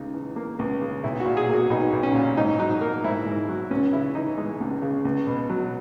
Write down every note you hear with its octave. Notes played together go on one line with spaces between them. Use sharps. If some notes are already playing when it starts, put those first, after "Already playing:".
Already playing: C#2 C#3 D#4
E3
A#3
C#2
C#3
B1 E4
F#4
A#2
G#4
A#3 F#4
B1 D#4
B1
C#4
A#2
G#2 D#4
F#3 D#4
A#3 A#4
G#2 E4
G#2
F#3
C#2 C#4
C#3 E4
E3 D#4
G#3
C#2
C#3
C#2
B2
F#3